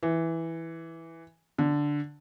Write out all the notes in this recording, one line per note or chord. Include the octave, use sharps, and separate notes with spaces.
E3
D3